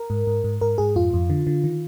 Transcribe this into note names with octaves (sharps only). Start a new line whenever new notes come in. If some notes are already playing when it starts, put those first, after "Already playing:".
Already playing: A#4
G#2
G#2
G#2
G#2 A#4
G#2 G#4
F2 F4
F2
D3
D3
D#3